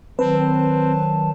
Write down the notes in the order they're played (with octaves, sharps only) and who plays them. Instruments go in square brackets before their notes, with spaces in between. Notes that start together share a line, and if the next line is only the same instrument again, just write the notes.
[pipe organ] D#3 F#3 A5 [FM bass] C4 [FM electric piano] B4